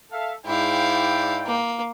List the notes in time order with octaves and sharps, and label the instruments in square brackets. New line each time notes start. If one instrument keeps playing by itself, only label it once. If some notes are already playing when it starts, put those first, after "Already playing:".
[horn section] A4 E5 F5
[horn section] G#2 D5 G5 [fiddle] E4 F5
[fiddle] A#3